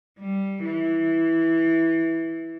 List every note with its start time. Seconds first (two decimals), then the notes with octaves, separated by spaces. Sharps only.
0.19 G3
0.64 E3